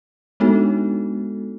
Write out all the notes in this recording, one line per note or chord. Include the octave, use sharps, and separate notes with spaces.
G#3 B3 D4 D#4 F#4 A4